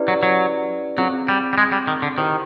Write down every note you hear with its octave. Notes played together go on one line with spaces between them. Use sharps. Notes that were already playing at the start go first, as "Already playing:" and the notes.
Already playing: C#4 E4 G4 B4 D5
F#3
F#3
F#3 C4 F4 G#4
G3
G3
G#3
G3
D#3
D3
D#3 E4 G4 C5